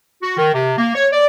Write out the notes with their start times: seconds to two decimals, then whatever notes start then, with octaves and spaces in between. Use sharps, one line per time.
0.23 F#4
0.37 D#3
0.54 C3
0.77 A#3
0.95 C#5
1.13 D5